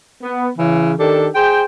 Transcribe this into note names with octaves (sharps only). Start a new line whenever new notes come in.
B3
C#3 E3
D#3 D4 G4 A4
G#4 C5 G5